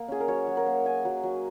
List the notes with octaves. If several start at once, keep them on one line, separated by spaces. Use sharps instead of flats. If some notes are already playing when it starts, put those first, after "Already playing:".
Already playing: A#3 D#5 F#5
C#4 G#4
A#4
F#3 C#5
F#3
A#4
A#3
C#4 G#5
F#3
F#3